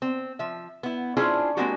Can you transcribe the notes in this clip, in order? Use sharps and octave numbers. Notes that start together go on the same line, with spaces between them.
C4
F3 E5
B3 E4
C#4 D4 E4 F4 G#4 C5
G#3 A#3 C4 D4 F#4 G4